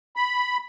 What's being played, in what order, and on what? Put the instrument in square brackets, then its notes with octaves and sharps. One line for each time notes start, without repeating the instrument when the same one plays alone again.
[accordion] B5